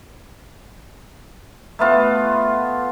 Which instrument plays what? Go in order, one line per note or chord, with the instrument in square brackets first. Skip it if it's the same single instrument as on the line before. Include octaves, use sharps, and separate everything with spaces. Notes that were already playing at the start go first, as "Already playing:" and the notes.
[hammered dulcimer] A3 B3 F4